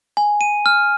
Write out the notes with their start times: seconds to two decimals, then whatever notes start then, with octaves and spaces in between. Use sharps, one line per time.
0.17 G#5
0.41 D#7
0.66 F6